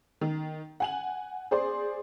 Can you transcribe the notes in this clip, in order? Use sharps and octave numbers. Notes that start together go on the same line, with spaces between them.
D#3
F#5 G#5 F#7
G#4 C5 D5 C6